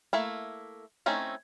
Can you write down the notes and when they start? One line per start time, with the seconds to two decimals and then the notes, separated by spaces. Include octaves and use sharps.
0.13 A3 A#3 E4
1.06 A3 C4 C#4 D#4 E4